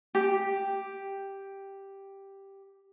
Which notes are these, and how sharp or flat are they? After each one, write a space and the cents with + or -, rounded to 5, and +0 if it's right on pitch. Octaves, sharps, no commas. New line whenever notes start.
G4 +0 G5 +5